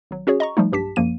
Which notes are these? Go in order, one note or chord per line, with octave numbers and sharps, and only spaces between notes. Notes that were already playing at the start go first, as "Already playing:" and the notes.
G#1 F#3
C#4 F#4 G#4 C#5
D#5 A#5 C#6
F3 G3 A3 D#4
B1 G2 G4 A5 B6
A#1 F#2 F3 A#3 D#7